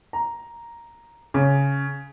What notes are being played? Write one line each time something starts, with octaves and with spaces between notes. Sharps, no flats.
A#5
C#3